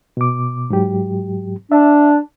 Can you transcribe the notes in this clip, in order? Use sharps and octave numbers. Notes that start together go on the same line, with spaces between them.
B2 D6
G#2 F#3 G4
D4 E5